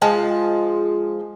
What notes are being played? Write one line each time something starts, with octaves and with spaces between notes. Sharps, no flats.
F3 G#3 F4 A5